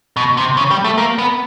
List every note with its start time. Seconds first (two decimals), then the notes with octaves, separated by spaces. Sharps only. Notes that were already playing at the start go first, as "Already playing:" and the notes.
0.17 B2
0.37 C3
0.57 C#3
0.71 G3
0.84 A3
0.98 A#3
1.18 B3